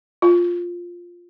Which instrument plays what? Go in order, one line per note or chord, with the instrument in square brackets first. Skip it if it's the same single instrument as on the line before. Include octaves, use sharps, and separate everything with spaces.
[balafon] F4